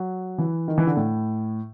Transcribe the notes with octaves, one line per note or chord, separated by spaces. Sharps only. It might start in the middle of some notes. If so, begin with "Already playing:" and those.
Already playing: F#3
E3
D#3
E3
D3
A2